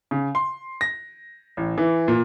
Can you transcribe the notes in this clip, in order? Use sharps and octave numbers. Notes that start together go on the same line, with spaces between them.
C#3
C6
A#6
A1
E3
A#2